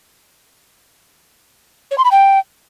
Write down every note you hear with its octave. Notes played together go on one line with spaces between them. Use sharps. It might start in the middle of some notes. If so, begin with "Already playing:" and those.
C#5
C6
B5
G5